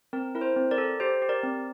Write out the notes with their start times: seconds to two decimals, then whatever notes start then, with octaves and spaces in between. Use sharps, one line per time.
0.13 C4 A#4
0.35 E4 A#4
0.41 C5
0.56 C4
0.71 A#4 D5
0.78 A4
1.00 G4 C5
1.22 G4
1.29 A#4 D5
1.43 C4